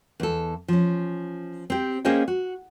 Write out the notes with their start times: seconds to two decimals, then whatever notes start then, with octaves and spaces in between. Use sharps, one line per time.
0.20 E2 A4
0.68 F3 C#4
1.70 C4 G4
2.05 A#3 C#4 G#4 C5 D#5 G5
2.28 F#4